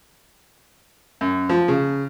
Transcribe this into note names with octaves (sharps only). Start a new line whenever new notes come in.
F#2
F3
C#3